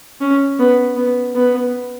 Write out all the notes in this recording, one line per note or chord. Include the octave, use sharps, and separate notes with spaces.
C#4
B3
B3
B3